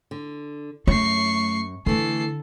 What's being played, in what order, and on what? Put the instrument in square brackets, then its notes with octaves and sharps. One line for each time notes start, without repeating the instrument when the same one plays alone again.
[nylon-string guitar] D3
[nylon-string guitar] F#2 C#5 [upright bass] A3 [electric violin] C#6 C7
[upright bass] D3 [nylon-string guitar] E3 A3 [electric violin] A4 C7